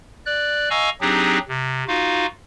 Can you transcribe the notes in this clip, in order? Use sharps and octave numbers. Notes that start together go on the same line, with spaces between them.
D5 F#6
D#5 F5 G#5 A#5 C#6 E6
F#3 C4 D4 D#4 G4 G#4
C3
D#4 F4 F#4 F5